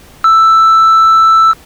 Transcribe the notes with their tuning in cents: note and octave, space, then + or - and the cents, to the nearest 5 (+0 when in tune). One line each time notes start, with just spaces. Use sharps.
E6 +5